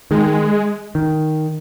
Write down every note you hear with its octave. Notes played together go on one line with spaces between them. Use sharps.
D#3 G#3
D#3